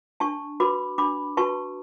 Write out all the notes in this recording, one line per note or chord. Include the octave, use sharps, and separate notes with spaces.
D4 A5 C#6
F#4 B4 B5 D6
D4 B5 D6
F#4 B4 A5 C#6